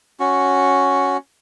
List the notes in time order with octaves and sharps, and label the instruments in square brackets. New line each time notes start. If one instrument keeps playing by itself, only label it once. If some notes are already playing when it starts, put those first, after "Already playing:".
[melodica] C#4 F#4